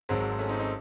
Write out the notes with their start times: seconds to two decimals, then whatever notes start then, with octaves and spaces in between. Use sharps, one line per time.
0.09 G#1 G#2 F#3 G#3 C4
0.39 A3 C#4
0.49 C4 D#4
0.59 C4 D#4